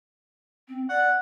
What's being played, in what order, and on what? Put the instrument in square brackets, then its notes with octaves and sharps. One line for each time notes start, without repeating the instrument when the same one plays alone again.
[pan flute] C4
[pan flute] D5 [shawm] F#5